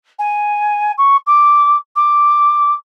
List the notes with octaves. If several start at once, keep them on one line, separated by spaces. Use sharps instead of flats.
G#5
C#6
D6
D6